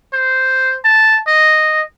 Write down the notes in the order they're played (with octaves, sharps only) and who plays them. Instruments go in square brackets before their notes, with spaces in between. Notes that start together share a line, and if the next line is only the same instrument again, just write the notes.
[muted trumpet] C5
A5
D#5